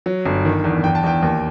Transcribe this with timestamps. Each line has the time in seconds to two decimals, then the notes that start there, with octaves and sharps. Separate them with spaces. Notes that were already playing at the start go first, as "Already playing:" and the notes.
0.06 F#3
0.25 G1
0.45 D#3
0.64 E2
0.84 E2 G5
0.95 A5
1.03 E2 G5
1.23 D#2